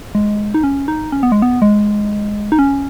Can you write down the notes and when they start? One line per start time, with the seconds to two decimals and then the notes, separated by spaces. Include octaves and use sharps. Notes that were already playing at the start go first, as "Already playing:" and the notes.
0.15 G#3
0.54 D#4
0.64 C#4
0.88 D#4
1.12 C#4
1.23 B3
1.32 G#3
1.42 B3
1.62 G#3
2.52 D#4
2.59 C#4